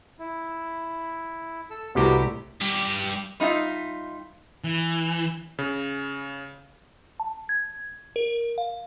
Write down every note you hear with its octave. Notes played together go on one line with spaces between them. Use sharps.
E4
A4 E6
C2 A2 C3 B3 F#4 G4 B4 E5
G2 G4
G3 D#4 F4 E5
E3
C#3
A5
G#6
A#4
F5